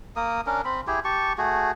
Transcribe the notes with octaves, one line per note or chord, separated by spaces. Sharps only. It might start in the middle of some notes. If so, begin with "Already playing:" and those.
A#3 A#4 D#6
C#4 D4 A#4
C4 B5
E4 G4 G#4
G4 A5 C#6
A3 F#4 G#4